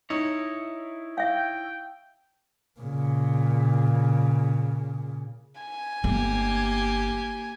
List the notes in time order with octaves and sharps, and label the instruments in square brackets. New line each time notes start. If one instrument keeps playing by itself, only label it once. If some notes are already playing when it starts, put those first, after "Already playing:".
[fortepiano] D#4 [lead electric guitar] E4 C#5
[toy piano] E5 F5 [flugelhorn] G5
[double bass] A#2 C#3
[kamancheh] G#5
[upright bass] G1 A3 [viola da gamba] A#3 G4